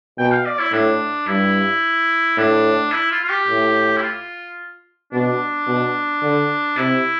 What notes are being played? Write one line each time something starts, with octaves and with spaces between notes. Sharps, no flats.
B2 G5
F5
D5
E4
A2 D4
G2 E4
A2 D4
E4
F4
F4
G4
A2
E4
F4
B2 D4
B2
D3
C3 E4